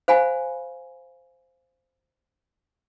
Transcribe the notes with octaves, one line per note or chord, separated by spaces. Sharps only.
C5 F5 F#5 G#5 B5